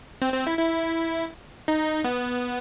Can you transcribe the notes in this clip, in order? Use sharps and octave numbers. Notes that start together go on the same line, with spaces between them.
C4
C4
E4
E4
D#4
B3